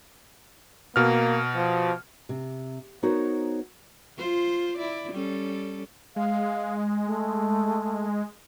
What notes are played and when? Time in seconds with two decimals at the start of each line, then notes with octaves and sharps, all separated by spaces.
0.96 B2 A#3 F6
1.55 F3
2.29 C3
3.03 B3 D#4 F#4 A#4 C5 C#5
4.18 F4 C5
4.77 E4 D5
5.12 G3 C#4 A4
6.16 G#3 F5
7.05 A3